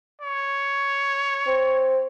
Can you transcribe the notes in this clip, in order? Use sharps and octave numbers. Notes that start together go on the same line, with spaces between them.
C#5
C4